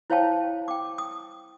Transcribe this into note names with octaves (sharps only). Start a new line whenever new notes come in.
E4 C5 C#5 F5 G5 A5
G5 D6
D#6